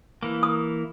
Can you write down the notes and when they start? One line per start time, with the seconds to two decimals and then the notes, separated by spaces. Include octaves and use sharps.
0.23 E3 A#3
0.43 D#6